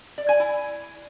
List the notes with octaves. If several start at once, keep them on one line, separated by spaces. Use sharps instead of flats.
D5
G#5
E4